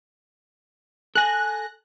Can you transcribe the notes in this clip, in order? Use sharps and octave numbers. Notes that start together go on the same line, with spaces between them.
A4 G#5 F#6 A#6